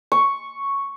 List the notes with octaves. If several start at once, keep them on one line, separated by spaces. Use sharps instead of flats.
C#6